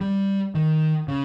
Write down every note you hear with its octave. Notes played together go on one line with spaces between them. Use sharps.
G3
D#3
C#3